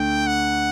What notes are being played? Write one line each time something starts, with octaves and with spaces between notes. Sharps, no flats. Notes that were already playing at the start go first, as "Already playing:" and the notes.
Already playing: D2 D3 A3 G5
F#5